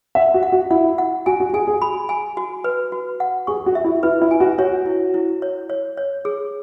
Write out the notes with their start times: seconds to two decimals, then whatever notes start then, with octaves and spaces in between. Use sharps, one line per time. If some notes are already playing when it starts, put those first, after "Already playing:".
0.15 E5 F#5
0.34 F#4
0.43 F#5
0.52 F#4
0.71 E4 F#5
0.98 F#5
1.26 F#4 G#5
1.40 F#4
1.53 G#4 G#5
1.67 G#4
1.82 B5
2.09 G#5
2.37 F#4
2.64 B4
2.92 F#4
3.20 F#5
3.47 G#4 C#6
3.66 F#4
3.75 E5
3.84 E4
4.03 E4 B4
4.22 E4
4.31 G#5
4.40 F#4
4.58 F#4 C#5
4.86 E4
5.14 E4
5.42 C#5
5.70 C#5
5.97 C#5
6.25 G#4